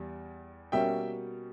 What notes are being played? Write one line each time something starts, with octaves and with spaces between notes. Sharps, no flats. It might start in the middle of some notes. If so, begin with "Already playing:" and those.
Already playing: E2 G3
B2 G3 A#3 C#4 E5 G5